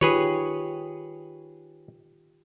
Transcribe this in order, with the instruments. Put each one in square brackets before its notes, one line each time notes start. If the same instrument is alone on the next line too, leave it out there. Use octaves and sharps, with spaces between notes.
[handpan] D#3 F4 G4 [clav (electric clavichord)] G#4 B4 C#5